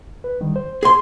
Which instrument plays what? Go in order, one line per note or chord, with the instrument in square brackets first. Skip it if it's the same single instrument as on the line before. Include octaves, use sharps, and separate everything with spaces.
[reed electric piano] B4
D3 D#3 G3
C5
[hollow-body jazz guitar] G#4 C6